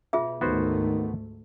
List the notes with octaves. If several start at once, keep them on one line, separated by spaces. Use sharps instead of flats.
B2 F4 G#4 E5
D2 G#2 D#3 A3 B3 F#4 C5